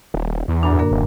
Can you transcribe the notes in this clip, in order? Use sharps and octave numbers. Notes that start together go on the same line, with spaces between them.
D#1
E2
F#2 A2 D4
D3 A#3 A#4
D#1